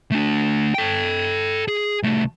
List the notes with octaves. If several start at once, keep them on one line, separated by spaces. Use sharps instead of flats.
A3 D4
A4 G5
G#4
C2 A3